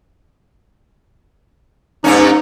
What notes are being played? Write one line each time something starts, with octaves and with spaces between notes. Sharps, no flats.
G2 A#3 C#4 D#4